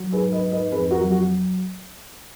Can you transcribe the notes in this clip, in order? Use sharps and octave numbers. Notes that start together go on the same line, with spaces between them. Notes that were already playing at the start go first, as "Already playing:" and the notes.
Already playing: F#3
G#2 G#4 B4
B4 D#5
G#2
B4 D#5
F2 G#4 B4
F#4 A#4
F#3
F#4